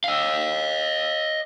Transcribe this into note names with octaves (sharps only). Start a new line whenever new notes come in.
D#5 F5